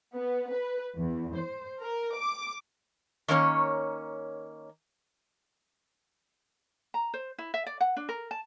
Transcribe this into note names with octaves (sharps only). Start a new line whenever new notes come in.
B3
B4
E2
C5
A#4
D6
D#3 A#3 C#4 C#5
A#5
C5
E4
E5
D5
F#5
D4
A#4
A5